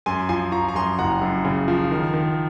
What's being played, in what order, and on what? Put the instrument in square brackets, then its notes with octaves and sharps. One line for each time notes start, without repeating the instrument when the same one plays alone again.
[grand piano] F#2 G#5 C6
F3 G#5 C6
F3 A#5 C#6
A#5
F#2 G#5 C6
F#1 F#5 A#5
F#2
C#3
F3
D#3
D#3